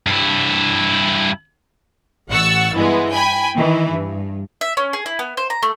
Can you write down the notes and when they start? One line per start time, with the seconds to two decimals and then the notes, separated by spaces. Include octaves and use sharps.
0.07 G2 E4
2.30 A1 F#5 C#6 E6 A6
2.74 G2 E3 G#3 B3
3.12 G5 G#5 B5
3.55 D#3 E3
3.90 G2
4.61 E5
4.77 C#4
4.93 G#4
5.06 E4
5.19 B3
5.37 C5
5.50 A#5
5.63 A3